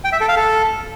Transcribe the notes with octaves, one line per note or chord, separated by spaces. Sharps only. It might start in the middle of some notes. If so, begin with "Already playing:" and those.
G5
E5
A4
F5
A4